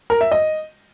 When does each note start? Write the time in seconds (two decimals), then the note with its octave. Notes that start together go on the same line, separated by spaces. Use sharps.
0.10 A#4
0.21 E5
0.31 D#5